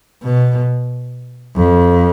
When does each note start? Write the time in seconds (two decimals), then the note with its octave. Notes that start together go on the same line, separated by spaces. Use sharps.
0.23 B2
1.56 F2